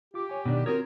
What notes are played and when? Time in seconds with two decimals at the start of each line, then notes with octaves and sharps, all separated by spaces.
0.14 F4 G4 D6
0.29 C#5 G#5
0.46 B2 D#3 D4 D5
0.66 C4 F4 F#4 A#4 C#5 D#6